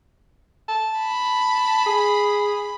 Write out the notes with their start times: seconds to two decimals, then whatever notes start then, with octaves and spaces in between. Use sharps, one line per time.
0.69 A5
1.00 B5
1.86 G#4